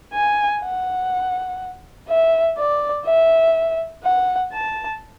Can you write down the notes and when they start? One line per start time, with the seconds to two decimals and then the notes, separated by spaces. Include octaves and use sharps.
0.13 G#5
0.62 F#5
2.09 E5
2.58 D5
3.06 E5
4.04 F#5
4.53 A5